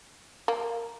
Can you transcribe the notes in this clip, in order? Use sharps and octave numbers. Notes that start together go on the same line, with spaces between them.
A#3